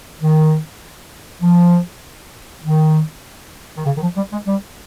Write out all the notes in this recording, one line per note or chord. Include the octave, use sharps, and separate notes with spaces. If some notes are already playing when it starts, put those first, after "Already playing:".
D#3
F3
D#3
D#3
C#3
D#3
F3
G3
G#3
G3